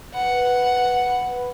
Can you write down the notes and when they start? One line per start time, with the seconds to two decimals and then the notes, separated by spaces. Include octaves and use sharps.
0.14 B4 F#5